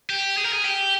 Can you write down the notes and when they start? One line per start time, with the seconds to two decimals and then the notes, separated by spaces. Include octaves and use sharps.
0.10 G4
0.37 G#4
0.45 A#4
0.53 G#4
0.65 G4